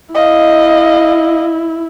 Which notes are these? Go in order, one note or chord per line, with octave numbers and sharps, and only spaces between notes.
E4 D#5 F5